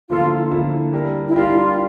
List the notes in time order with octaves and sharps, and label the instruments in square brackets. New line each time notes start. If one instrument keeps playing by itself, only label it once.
[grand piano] D3 F3 A#3 E4 A4 [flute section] F4
[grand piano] D3 F3 A#3 E4 A4
G3 D4 G4 A#4
[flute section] E4
[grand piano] G3 D4 G4 A#4 [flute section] F4